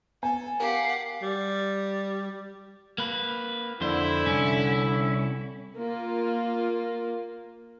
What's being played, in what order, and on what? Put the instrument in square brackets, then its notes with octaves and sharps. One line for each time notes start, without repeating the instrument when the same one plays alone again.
[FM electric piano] B3 [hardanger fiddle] A4 [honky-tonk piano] G#5
[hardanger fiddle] G4 F#5 [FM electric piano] A#4 [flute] F5
[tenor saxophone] G3
[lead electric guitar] A#3 B4
[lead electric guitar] F2 C5 [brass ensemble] D3 E4
[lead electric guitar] C2 C#4
[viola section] A#3 F4